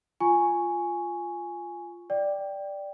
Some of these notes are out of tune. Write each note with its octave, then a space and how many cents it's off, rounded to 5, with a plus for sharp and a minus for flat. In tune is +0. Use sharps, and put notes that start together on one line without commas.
F4 +0 G#5 +0 C#6 +0
D5 +0 G5 +0